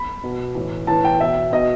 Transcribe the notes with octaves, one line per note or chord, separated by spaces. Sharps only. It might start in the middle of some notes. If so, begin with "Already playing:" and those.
Already playing: B5
B2
A2 E3
A2 E3 A5
G5
B2 E5
B2 D#5